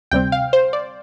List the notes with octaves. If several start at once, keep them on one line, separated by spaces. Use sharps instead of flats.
D2 C3 G3 C4 G5
F5
C5
D5